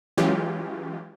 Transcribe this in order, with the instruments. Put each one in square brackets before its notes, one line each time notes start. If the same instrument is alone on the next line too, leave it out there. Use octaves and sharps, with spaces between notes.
[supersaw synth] E3 F#3 G#3 C#4 F4 G4